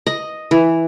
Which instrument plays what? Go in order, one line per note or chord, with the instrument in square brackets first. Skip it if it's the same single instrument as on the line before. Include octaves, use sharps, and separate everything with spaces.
[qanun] D#5
E3